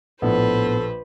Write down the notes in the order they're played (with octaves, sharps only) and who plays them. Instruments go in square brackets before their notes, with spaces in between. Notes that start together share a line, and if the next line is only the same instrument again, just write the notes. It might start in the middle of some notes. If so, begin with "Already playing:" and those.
[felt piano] A#1 [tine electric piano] A2 B3 [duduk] A4 [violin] B4 C5